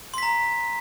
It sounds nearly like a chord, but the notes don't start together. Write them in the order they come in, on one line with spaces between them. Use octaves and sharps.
C6 B6 A#5